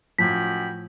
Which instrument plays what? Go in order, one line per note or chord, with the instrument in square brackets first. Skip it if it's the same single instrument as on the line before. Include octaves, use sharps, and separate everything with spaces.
[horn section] F#2 G5 B5 [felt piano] A2 F3 [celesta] B6